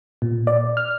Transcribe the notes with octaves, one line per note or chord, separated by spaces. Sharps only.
A#2
D5
F6